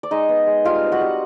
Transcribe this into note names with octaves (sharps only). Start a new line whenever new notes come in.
D5
G#3 D#4 D#5
B3
G#3
G3 F4 F5
C4
F#4 F#5
G3